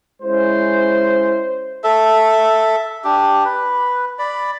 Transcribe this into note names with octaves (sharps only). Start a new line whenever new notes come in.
G#3 C#4 E4 C5
A4 E5
D4 G4
B4
D5 B5